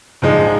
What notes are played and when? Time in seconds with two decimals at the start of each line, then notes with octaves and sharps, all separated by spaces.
0.22 A#1 G#2 F3 G#3